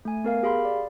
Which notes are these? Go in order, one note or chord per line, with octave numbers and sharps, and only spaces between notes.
A3 G#5
B3 A#4 F5
G4 G#4 F5 B5 C6
D5